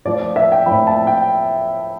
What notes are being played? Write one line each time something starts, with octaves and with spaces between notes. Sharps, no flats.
A2 F3 D5
D5
E5
G5
A2 F3 B5
A5
G5